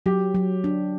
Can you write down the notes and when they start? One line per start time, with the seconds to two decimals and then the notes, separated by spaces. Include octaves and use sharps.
0.06 F#3 G4
0.35 F#3
0.64 D4